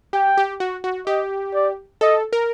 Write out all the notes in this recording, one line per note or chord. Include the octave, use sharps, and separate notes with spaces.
G4 G5
G4
F#4
F#4
G4 D#5
D5
A4 D#5
A#4